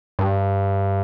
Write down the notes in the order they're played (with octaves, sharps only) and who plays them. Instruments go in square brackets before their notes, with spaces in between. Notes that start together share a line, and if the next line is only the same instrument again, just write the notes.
[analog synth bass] G2